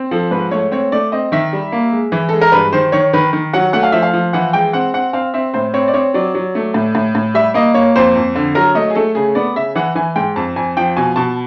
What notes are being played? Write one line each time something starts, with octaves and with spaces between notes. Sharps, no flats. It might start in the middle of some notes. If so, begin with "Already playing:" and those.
Already playing: C4
F3 A4
G#2 B4
A3 C#5
C4 C#5
A3 D5
C4 D#5
D#3 E5
G3
A#3
G#3
E3
G#3 A4
A#4
G2 B4
D#3 C5
D#3 C#5
D#3 B4
D#3
F#3 F#5
A3 F#5
F5
F3 E5
F5
F3
E3 F#5
G#3 G5
C4 F#5
C4 F#5
C4 F5
C4 E5
A2 C5
C4 C#5
D5
C4 C#5
F#3 D5
F#3
A3
A2
A2
A2
G3 E5
A#3 D#5
A#3 C#5
F2 C5
F2
D3
F#3 A#4
A3 D#5
G#4
A3 A4
C#3 G#4
B3 D5
C#3 E5
E3 F#5
E3 G#5
G#2 G5
F2 A5
F2 G#5
F3 G5
B2 G#5
B2 A5